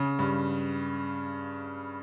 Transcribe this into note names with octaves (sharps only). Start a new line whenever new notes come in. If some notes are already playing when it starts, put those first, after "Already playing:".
Already playing: C#3
G2